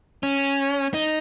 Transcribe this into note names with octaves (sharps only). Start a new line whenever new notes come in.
C#4
D#4